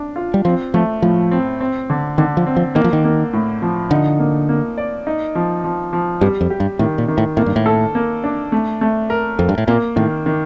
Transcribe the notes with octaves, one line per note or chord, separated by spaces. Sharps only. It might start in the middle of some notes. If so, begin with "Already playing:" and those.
Already playing: D4
F4
G3
F3 C4
F3 A3
A2 F3
C4
C4
D3
D3 D#3
F3
C4
F3
D#3 A#3
F3
D#3
A#3
A2
F3
D3 D#4
A#3
A#3
D5
D#4
F3
F3
F3
G2 G3
F2
G4
G2
A2 D#3
A#2
D#3
A2
A2 A#3
G2
A2
A4
A#3
D4
A3
A3
A#4
F2 A#4
G2
A2
A#2 A#3
A2 D#3
D#3